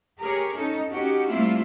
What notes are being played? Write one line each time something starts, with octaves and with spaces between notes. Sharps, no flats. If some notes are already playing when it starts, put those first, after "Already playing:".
G4 G#4 A#4 C#5
C#4 D#4 A4
C#4 D#4 F#4 G4
G3 A3 A#3 C4 E4 F4